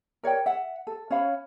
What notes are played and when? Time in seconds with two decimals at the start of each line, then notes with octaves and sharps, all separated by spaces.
0.23 A#4 C#5 D5 G5
0.46 E5 F#5
0.87 A4
1.10 C#4 C#5 F5 B5